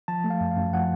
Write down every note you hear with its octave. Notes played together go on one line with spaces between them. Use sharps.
F3 A5
A3
F5
F#2
F5
F#2
F3 F#5